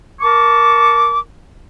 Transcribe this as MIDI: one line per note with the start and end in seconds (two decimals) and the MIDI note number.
0.21 1.19 70
0.21 1.19 81
0.21 1.19 85
0.21 1.19 86